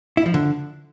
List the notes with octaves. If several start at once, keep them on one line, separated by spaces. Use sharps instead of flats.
E4
F3
D3